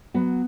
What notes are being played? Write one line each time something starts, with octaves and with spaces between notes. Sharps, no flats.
F#3 B3